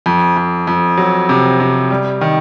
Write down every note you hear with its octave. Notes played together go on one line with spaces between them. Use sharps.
F2
F2
F2
F#3
C3
C3
G3
D#3